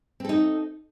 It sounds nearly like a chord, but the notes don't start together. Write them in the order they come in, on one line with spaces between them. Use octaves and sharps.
C4 A4 D#4